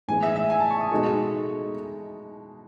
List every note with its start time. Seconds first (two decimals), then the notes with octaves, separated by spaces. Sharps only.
0.08 A2 E3 G#3 B3 G#5
0.23 E5
0.36 E5
0.50 G#5
0.60 A5
0.70 C#6
0.81 D#6
0.91 B2 G#3 D#4 F#4 A4 C#6